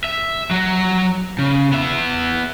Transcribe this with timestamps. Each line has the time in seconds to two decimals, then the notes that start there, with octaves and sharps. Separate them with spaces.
0.04 E5
0.51 F#3 F#4
1.39 C#3
1.72 B3 E5